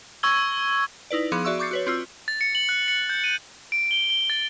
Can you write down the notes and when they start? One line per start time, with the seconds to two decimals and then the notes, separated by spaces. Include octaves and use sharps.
0.23 C#6 E6 G#6 G7
1.10 D#4 E4 B4 D5
1.32 F3 B3 G#4 C6 D6 C#7
1.45 F#4 D5 E5 C#6 E6
1.59 C#6 D6 G6 A6 C7 C#7
1.71 F#4 B4 C#5
1.87 C4 F4 E6
2.28 A6
2.41 C#7
2.55 F#7
2.69 F#6
2.88 C#7
3.09 G6
3.24 D#7
3.72 D7
3.91 G7
4.10 G7
4.30 A6